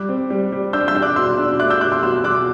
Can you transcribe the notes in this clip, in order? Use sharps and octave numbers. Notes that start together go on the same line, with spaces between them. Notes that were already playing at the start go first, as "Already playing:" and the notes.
Already playing: G3 D6 F#6
C4
G3
G3
D4 E6 G6
E6 G6
D4
D6 F#6
B2 C6 E6
D4
A3 D6 F#6
E6 G6
B2 D6 F#6
C6 E6
B2 C6 E6
B2 D6 F#6